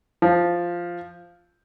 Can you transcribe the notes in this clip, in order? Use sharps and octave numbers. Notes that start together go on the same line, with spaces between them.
F3